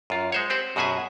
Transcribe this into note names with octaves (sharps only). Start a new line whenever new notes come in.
F#2 F4
G#3 C5 C#5
C4 G4 C5 F#5
F#2 B2 F#4 G#4 E5 G#5